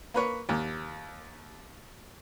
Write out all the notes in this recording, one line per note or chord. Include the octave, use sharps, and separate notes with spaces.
A#3 B4 C#5
D#2